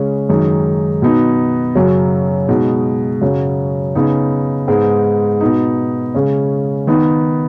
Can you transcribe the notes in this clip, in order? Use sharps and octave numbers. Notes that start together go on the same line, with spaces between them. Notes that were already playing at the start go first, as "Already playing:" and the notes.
Already playing: C#3 G#3 C#4
F#2 D#3 G#3 D#4
B2 B3 D#4
F#2 C#3 F#3
B2 G#3 D#4
F#2 C#3 F#3
C#3 B3 D#4
G#2 G#3 B3 D#4
B2 B3 D#4
C#3 G#3 C#4
D#3 B3 D#4